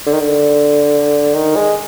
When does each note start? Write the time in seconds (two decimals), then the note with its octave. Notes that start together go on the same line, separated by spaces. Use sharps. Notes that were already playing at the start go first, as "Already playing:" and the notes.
0.06 D3
0.13 D#3
0.20 D3
1.34 D#3
1.56 G#3